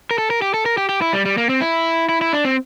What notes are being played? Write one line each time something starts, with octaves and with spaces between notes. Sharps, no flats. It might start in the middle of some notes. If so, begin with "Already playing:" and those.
A#4
A4
A#4
G4
A4
A#4
G4
G4
E4
G3
G3
A#3
C4
E4
E4
E4
D4
C4